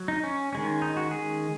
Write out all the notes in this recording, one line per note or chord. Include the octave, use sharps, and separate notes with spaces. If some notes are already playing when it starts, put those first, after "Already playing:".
Already playing: F#3
D#4
C#4
D#3 G#3 C#4
D#4
F#4
G#4